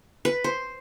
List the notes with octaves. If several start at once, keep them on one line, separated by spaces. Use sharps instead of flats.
B4
C5